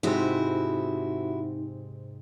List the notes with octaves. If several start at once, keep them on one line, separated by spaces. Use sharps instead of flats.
G#2 C3 D#4 E4 F#4